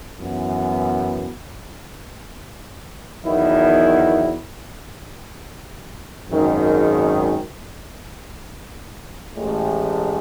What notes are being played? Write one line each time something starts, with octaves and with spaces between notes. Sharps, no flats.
F#2 E3 B3
E2 D#3 F#3 B3 E4
G#1 F#2 D#3 G#3
A1 A2 G#3